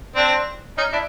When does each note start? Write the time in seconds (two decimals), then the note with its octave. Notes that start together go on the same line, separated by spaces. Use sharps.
0.15 C4 D4
0.78 C#4 D#4
0.92 D4 E4